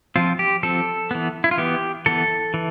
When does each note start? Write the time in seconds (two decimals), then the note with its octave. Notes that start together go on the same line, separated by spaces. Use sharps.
0.16 F3 C4 F4
0.39 G4
0.63 F3 C4 A4
1.11 E3 B3
1.44 E4
1.51 F4
1.58 E3 B3 G4
2.06 E3 B3 A4
2.54 E3